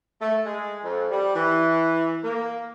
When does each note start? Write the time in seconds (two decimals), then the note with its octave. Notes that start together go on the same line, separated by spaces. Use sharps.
0.21 A3
0.45 G#3
0.83 F2
1.11 G3
1.34 E3
2.23 A#3